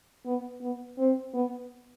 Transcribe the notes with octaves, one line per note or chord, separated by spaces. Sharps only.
B3
B3
C4
B3